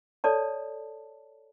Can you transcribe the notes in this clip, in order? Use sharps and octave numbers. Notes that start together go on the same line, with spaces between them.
A4 C#5 D5 A5